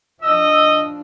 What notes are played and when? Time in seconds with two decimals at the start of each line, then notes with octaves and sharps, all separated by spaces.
0.22 F3 D4 D#5 E6